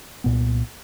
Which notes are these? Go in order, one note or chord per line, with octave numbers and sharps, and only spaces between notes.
C2 A#2 B3